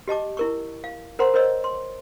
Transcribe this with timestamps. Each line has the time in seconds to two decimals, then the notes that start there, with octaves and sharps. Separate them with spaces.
0.08 G4 D#5 A5 D6
0.37 E4 A#4 C#6
0.84 F5
1.19 A#4 C5 F#5 A#5 C6
1.34 A#4 C5 C#5 D#5 E6
1.64 C6